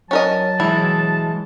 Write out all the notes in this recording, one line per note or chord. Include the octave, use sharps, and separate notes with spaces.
F#3 C#4 A#4 D#5 A5
E3 G#3 E4